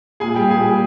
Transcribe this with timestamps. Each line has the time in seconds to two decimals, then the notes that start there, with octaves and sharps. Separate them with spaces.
0.20 A#2 G#4 G#5
0.35 G3 G4 G5
0.50 A#2 G#4 G#5
0.66 G3